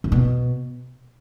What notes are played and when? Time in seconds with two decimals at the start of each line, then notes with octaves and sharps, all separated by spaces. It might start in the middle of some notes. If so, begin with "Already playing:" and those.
0.04 C3
0.12 B2